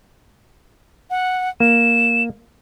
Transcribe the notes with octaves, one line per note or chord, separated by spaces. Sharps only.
F#5
A#3 E7